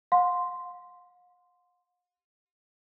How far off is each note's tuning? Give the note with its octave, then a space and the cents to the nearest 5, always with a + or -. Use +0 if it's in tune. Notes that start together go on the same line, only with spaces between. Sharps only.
F5 +45 C6 -5